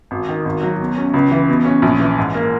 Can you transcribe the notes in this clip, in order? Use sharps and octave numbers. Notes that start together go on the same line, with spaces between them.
G#1
D#3
G#1
F#3
B2
C#4
C#2
E3
B2
C#4
A#1
E3
G#2
A#3